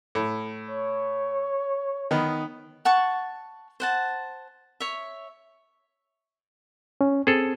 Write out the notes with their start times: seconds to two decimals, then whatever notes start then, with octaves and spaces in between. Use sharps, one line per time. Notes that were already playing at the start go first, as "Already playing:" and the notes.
0.15 A2
0.69 C#5
2.11 D#3 B3
2.85 F#5 A5 C#6
3.80 C5 F#5 A5
4.80 C#5 E5
7.01 C#4
7.27 C4 G#4 A4